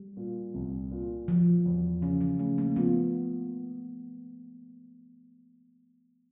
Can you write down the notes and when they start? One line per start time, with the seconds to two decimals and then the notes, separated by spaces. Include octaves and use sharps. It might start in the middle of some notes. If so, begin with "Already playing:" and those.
Already playing: G3
0.17 A#2
0.54 C2
0.91 A#2
1.28 F3 F#3
1.66 E2
2.02 C#3 F3
2.21 F#3
2.39 C#3 A3
2.58 A#3
2.76 F3 B3